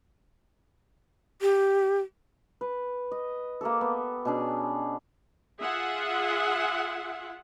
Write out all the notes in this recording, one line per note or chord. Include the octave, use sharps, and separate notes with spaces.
G4
B4
D#5
A#3 G4 A4
B3
B2 C#4 D4 G#4
F4 G#4 E5 F#5